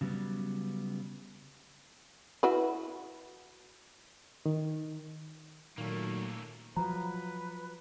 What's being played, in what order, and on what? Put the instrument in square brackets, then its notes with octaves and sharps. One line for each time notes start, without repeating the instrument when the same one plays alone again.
[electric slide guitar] C#3 F#3 G3 B3
[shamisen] E4 F#4 B4
[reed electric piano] D#3
[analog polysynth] A#2 [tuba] D#3 [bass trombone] F#3 [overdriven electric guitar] A3 A#3
[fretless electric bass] F3 F#3 [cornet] B4 [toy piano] A#5